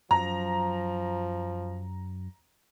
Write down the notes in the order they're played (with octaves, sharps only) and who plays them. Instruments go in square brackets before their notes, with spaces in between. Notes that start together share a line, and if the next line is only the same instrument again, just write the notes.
[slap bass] F#2 F#3 [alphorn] F3 [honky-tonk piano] A#5